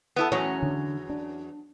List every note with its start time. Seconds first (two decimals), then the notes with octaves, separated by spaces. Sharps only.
0.16 B3 E4 A4
0.32 E2 F#3 C#4
0.63 D3
1.10 D4